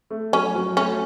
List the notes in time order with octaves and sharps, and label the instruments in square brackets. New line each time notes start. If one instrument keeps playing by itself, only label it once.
[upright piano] A3
[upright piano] F#3 [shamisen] C#4
[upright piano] F#3
[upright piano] A3 [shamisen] C#4